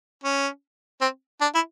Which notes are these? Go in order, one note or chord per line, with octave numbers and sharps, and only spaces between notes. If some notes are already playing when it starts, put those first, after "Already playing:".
C#4
C4
D4
E4